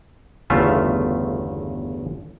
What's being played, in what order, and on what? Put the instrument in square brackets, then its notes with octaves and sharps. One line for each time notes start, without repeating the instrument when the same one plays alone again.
[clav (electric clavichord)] G1 E2 C#3 A3 F4 E5